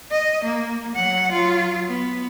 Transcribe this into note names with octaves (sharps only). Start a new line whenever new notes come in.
D#5
A#3
F#3 F#5
F#3 F4
B3